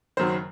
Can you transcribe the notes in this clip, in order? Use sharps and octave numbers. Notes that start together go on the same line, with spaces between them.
F#1 F#2 D#3 F#3 C5